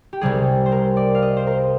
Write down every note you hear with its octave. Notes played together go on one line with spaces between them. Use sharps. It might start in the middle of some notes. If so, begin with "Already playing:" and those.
G4
C2 C3 G3 G#4
C5
A#4
D5
F5
D#5
C5
A#4